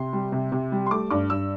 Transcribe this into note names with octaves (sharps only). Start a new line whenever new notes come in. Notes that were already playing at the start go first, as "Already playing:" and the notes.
Already playing: C3 C6
G3
C3
C3
G3
C6
A3 D6
G2 D6
G2 E6